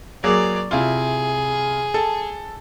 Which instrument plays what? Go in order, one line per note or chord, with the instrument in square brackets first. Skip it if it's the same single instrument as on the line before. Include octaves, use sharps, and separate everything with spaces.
[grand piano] F#3 A#3 G#4 [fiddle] D5
[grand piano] C3 E4 F4 [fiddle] G#4
[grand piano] A4